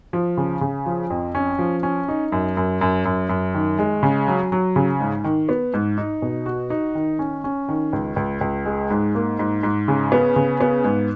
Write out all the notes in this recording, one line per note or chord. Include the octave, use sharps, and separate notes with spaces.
F3
C#3
C#3
F3
F2
C#4
F3
C#4
D#4
F#2
F#2
F#2
F#2
F#2
D#3
G#3
C#3
F#3
F#3
C#3
G#2
D#3
B3
G#2
D#4
B2
F#4
D#4
D#3
C#4
C#4
D#3
C#2
C#2
C#2
G#3
G#2
A#3
G#2
G#2
C#3
B3
C#3
B3
G#2